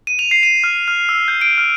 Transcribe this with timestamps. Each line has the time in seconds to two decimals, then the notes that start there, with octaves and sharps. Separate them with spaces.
0.07 D#7
0.19 F7
0.31 C7
0.43 D#7
0.64 F6
0.88 F6
1.09 E6
1.28 G6
1.41 D7
1.58 F6